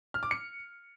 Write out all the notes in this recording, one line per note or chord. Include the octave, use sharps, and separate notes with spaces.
F6
D6
C#7